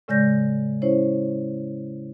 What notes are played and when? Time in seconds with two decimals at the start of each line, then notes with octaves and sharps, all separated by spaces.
0.08 A2 C#3 G#3 D5 G6 A#6
0.82 C#4 E4 C5 C#5